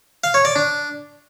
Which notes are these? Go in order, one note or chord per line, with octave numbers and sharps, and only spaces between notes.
F5
C#5
D5
D4